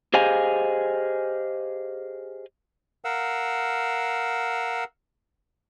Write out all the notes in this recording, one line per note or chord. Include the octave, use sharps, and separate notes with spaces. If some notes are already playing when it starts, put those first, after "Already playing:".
G4 G#4 C5 D#5 F5 G#5
A#4 F5 F#5 E6